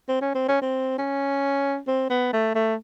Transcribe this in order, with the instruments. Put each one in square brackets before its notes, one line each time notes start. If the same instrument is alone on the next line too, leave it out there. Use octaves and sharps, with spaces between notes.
[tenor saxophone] C4
C#4
C4
C#4
C4
C#4
C4
B3
A3
A3